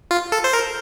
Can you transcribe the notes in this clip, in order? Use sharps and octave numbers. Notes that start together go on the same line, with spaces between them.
F4
A4
C5
A#4